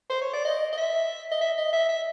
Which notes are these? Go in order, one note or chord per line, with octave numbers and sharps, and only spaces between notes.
C5
C#5
D5
D#5
D#5
E5
D#5
E5
D#5
E5
E5